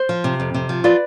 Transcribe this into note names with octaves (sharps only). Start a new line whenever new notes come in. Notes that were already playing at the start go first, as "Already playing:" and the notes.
Already playing: C5
F3
C3
F2
C3
F3
F4 B4 D5